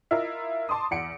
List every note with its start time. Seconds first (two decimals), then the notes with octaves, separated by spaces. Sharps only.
0.11 E4 F4 A#4 D#5
0.69 A5 C6 D6 D#6
0.91 E2 F#5 C#7 D7